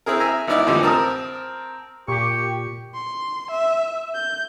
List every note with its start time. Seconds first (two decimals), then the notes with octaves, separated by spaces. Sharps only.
0.06 C4 E4 G#4 A#4
0.20 E5 G#5 A#5
0.47 G#1 B3 D#4 E4 D5 D#5
0.67 F2 A2 D3 E3 F3 G3
0.83 C4 A#4 A5 A#5 D#6
2.08 A#2 G4 C#6
2.95 C6
3.51 E5
4.15 G6